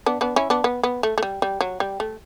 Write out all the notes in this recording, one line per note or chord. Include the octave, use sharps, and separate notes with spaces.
B3 D4
B3 D4
C#4 E4
B3 D4
B3
B3
A3
A3
G3
G3
F#3
G3
A3